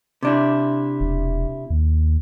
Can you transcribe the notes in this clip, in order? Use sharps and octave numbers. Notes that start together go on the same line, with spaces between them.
C3 D4 E4
E1
D#2